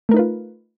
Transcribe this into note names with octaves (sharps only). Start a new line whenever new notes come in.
A3 D#4 F4 A#4 B4